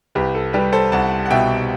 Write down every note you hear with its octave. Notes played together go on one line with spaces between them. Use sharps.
C2 G4 B4
A4
G3 G4 B4
A4 C5
C2 F#5 A5
F#5
B2 E5 G5